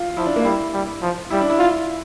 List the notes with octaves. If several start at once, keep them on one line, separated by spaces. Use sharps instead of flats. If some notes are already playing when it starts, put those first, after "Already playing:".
Already playing: F4
F3 E4
D4
A#3
G3 E4
G3
F3
G3 E4
D4
E4
F4